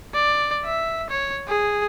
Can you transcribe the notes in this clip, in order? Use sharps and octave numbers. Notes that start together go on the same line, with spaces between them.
D5
E5
C#5
G#4